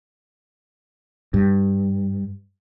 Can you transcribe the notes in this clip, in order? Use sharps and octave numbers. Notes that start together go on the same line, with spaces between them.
G2